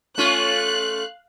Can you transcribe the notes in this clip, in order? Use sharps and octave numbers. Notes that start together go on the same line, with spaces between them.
A3 C#4 F4 F5 F#6